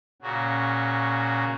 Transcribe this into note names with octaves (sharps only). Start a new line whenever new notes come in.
A#2 C#3 F#4